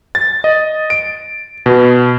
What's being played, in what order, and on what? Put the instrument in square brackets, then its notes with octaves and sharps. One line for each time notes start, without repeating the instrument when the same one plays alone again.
[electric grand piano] A6
D#5
D7
B2